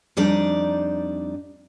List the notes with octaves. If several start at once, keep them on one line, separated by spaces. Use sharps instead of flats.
F2 G3 D4 D#4 D5 A#5